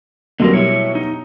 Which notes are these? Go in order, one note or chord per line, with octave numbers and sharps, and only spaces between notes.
B2 D3 F#3 G3 C4 A#4
E4 C#5
D#4